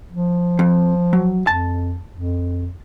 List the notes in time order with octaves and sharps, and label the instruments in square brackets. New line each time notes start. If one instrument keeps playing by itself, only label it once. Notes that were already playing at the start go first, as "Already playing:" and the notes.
[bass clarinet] F3
[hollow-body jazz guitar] F2
F#3
[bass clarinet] F2 [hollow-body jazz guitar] A5
[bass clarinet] F2